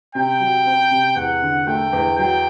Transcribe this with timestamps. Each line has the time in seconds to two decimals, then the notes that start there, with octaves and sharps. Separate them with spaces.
0.15 C3 G5
0.40 F#3
0.66 C4
0.91 C3
1.16 E2 F#5
1.42 D3
1.67 A3 G5
1.93 E2
2.18 F#3 G5